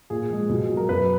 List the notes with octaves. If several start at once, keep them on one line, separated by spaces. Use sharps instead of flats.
A#2 G#4
F3 G#3
B2
F#3
A#4
F#2 B4